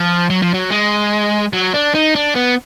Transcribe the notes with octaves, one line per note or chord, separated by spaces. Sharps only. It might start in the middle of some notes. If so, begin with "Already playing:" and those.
Already playing: F3
F#3
F3
F#3
G#3
F#3
D4
D#4
D4
B3